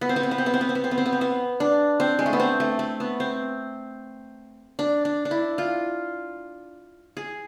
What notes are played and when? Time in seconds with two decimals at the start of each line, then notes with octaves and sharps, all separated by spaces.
0.01 B3
0.09 C4
0.16 B3
0.23 C4
0.31 B3
0.38 C4
0.46 B3
0.54 C4
0.61 B3
0.69 C4
0.75 B3
0.84 C4
0.91 B3
0.98 C4
1.06 B3
1.13 C4
1.21 B3
1.60 D4
2.00 C4
2.19 G#3
2.26 A3
2.33 B3
2.40 C4
2.60 A3
2.79 A3
3.00 B3
3.20 C4
4.79 D4
5.05 D4
5.25 D4
5.31 E4
5.58 F4
7.17 G#4